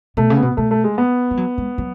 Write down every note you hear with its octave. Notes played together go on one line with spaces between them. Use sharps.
B2 A3
C#3
B3
B2
B2 A3
A3
G#3
B3
G#3
F#3
G#3
F#3